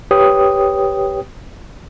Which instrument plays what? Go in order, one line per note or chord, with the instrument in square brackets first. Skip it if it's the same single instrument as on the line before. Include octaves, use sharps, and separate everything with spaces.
[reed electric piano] G4 B4 C#5 G5 D#6